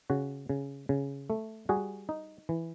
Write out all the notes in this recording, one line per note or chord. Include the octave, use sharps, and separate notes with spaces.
C#3 F#4
C#3
C#3
A3
G3 F#4 G#4
D#4
E3